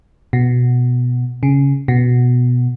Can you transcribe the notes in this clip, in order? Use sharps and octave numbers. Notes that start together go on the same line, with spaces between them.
B2
C#3
B2